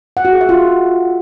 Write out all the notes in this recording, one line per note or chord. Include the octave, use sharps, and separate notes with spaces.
F#5
F#4
G#4
E5
F4